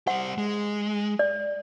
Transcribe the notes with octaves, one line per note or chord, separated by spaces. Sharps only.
G3 C5 F#5
G#3
D5